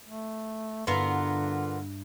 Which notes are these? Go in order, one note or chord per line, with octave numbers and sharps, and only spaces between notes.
A3
G2 D3 B3 E4 F4 A#4